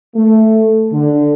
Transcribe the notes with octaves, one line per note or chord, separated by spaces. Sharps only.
A3
D3